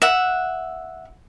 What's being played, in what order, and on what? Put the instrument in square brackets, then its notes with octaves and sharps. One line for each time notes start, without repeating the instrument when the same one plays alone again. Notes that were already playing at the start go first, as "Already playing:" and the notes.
[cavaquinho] E5 F#5